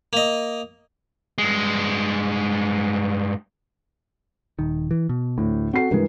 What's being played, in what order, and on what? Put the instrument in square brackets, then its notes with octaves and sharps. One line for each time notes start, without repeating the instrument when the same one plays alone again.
[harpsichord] A#3 D#5
[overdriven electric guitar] G2 G#3
[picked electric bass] D#1 D#3
E3
B2
[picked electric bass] D2 [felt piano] A2
[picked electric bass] C4 [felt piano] F#4 A4 C7
[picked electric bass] G2 G#3 [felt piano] E3 A#4